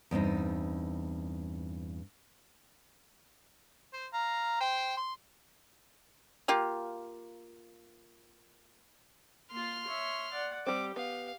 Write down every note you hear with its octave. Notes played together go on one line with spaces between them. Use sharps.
E2 G2 C4 D#4
C5
F5 A#5
C5 G5
C6
A#3 F4 G4
A#3 F4 C6 F6
C#5 E5
D5 F#5
G3 C4 G4 D6
B3 F5